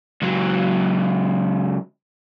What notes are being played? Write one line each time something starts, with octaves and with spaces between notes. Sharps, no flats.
C#2 F#3